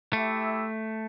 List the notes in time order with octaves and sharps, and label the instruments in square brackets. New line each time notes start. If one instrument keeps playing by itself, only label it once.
[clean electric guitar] A3 [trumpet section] E4 G4 E5